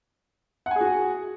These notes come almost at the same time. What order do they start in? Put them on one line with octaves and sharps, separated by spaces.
F#5 G#5 G#4 F#4